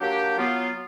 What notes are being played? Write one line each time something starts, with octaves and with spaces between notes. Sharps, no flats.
F#3 A#3 D4 G4
F#3 B3 F4